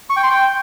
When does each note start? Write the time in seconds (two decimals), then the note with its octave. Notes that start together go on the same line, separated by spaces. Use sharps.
0.10 C#6
0.16 G5
0.23 C6
0.30 G5